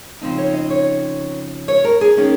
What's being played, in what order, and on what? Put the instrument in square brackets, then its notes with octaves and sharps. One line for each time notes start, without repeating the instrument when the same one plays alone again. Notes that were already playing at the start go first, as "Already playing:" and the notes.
[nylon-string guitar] C#3 F3 C4 D#4
C#5
D#5
C#5
C#5
A#4
G#4
D#3 A#3 C#4